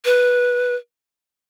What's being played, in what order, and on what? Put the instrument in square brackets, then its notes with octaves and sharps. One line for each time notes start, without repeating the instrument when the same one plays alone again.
[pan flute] B4